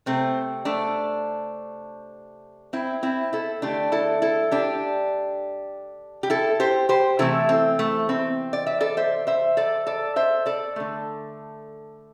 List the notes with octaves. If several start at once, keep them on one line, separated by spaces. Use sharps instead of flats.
C3 A3 C4
A3 D4
C4 E4
C4 E4
E4 A4
D3 A3 D4 G4
E4 A4
E4 A4
D4 G4
G4
E4 A4
G4 C5
G4 C5
C3 E3 A3 E4 A4
C4
A3
C4
D5
E5
A4 D5
C5 E5
C5 E5
A4 D5
A4 D5
C5 E5
A4 D5
D3 A3